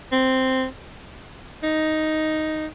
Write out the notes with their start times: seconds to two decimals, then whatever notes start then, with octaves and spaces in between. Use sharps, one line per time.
0.12 C4
1.63 D#4